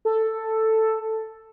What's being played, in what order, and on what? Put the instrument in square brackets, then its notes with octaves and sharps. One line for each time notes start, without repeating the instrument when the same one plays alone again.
[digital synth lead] A4